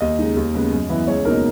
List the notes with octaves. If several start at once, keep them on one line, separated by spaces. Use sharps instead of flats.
D#2 D#5
C#3 G#3 D#4
D#2
C#3 G#3 B3
F#2
E3 B3 E4
C#2 C#5
B2 A#3 D#4 A#4